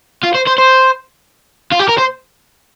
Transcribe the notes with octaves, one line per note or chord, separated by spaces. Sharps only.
F4
C5
C5
C5
F4
G4
A#4
C5